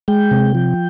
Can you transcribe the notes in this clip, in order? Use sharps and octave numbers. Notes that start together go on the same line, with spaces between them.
G#3 G5
C3
F3